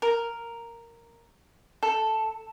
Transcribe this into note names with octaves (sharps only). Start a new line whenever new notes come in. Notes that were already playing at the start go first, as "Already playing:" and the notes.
A#4
A4